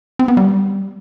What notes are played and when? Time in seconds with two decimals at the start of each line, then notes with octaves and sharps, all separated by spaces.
0.19 C4
0.28 B3
0.37 G3